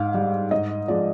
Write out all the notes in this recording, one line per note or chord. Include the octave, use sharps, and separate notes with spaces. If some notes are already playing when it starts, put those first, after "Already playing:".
Already playing: G#2 F5
G3
G#2 D#5
F3 G#3 D5